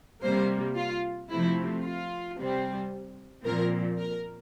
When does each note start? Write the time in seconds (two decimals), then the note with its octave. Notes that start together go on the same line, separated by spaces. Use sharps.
0.23 C3 G3 A#3 C5
0.76 F4
1.30 C3 F3 A3 C4 E4
1.84 F4
2.38 C3 G3 C4
3.44 A#2 F3 C4 A#4
3.98 A#4